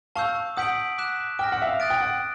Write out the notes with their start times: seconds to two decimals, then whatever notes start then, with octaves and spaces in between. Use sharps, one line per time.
0.16 F5 A5 C#6 E6 G6
0.57 F#5 D#6 G6 B6 D7 F#7
0.98 D6 F#6 B6 E7
1.39 G5 D6 F6 A#6
1.52 F#5
1.62 E5
1.67 F5
1.80 D#6 F#6 A6 D7
1.90 G5
2.01 F#5